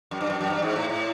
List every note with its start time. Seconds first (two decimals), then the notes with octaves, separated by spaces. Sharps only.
0.11 F#2
0.21 G2
0.30 F#2
0.41 F#2
0.50 G2
0.62 G#2
0.76 A2
0.89 A2